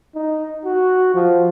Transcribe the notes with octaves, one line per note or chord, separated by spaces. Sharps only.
D#4
F#4
F3